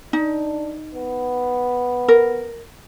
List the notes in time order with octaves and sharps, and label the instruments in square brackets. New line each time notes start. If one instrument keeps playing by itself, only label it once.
[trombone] D4 [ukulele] D#4
[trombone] B3
[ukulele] A#4